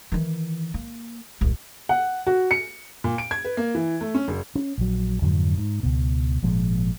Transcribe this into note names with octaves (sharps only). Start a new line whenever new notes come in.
D#3 E3
A#3
D#1 C2
F#5
F#4
C#7
A#2
D7
G#6
B4
A#3
E3
A3
C#4
F#1
C#4
A#1 F#3
F2 G#2 D3 F#3
G#2
C#2 B2
G#1 A#2 F3 G#3